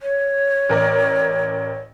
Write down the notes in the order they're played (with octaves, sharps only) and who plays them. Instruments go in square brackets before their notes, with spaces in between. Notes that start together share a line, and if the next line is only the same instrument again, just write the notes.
[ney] C#5
[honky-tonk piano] A1 A#4 D5